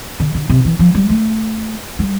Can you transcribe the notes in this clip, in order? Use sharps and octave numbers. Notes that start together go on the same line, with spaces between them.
D3
D3
C3
E3
F3
G3
A3
G3